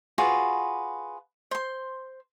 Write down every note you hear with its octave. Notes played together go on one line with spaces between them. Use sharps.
F4 F#4 G#4 B4
C5 C6